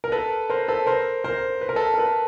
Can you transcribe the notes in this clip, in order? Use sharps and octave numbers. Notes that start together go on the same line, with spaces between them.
A#4
A4 B4
A#4 C5
A4 B4
A#4 C5
A#4 C5
B4
A#4
A4 B4
A#4
A4 B4